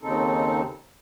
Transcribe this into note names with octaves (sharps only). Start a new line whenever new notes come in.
D#2 C#3 C4 D#4 A4